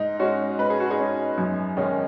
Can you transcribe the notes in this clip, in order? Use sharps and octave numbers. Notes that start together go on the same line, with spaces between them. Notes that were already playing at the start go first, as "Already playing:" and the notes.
Already playing: G#2 D#4
G#3 C#4 F#4
G#2 B4
G#4
F#4
D#4 G#4
G#3 C#4
F#2
D#3 G#3 C#4